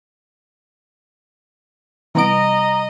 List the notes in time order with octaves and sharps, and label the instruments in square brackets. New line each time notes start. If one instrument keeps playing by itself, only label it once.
[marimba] C3 G3 [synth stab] E3 B3 D7 [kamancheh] D#5 [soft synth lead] A#5